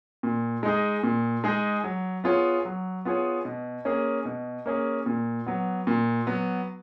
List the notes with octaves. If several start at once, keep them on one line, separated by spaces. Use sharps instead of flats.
A#2
G#3 D#4 G#4
A#2
G#3 D#4 G#4
F#3
B3 F4 G#4 C#5
F#3
B3 F4 G#4 C#5
B2
A#3 C#4 G#4
B2
A#3 C#4 G#4
A#2
F#3 B3
A#2
F#3 B3